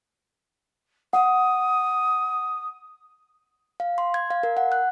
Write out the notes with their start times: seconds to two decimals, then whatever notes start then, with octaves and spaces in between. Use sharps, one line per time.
1.13 F#5 D#6
3.80 F5
3.98 C6
4.14 G#6
4.30 F5
4.43 A#4
4.57 F#5
4.72 F#6